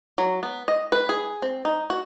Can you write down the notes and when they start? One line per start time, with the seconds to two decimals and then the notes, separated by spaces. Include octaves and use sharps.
0.18 F#3
0.43 B3
0.68 D#5
0.92 B4
1.09 G#4
1.42 C4
1.65 D#4
1.90 F#4